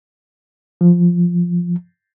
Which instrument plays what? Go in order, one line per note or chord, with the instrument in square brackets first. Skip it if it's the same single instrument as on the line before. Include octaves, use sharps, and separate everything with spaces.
[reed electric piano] F3